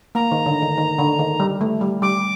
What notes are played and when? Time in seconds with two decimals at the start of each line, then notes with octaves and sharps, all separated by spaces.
0.15 A#3 A#5
0.31 D#3
0.46 D3
0.62 D#3
0.78 D#3
0.99 D3
1.19 D#3
1.40 G3
1.61 A3
1.81 G3
2.02 G3 D6